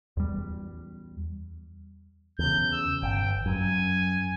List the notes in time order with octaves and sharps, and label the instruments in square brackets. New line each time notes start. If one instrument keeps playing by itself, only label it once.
[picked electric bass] E2 G3
[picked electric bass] E2 C#3 [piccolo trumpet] G6
[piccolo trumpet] E6
[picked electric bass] G1 [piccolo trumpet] G5
[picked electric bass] F#2 [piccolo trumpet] G#5